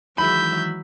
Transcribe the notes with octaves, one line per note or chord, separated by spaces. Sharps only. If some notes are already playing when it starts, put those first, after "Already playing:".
D#3 E3 F#3 G#3 E5 B5 G6